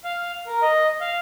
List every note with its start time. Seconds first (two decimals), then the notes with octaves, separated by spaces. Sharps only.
0.04 F5
0.47 A#4
0.62 D#5
1.01 F5